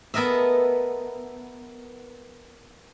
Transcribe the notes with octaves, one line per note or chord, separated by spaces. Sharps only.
B3 A4 A#4 D#5 E5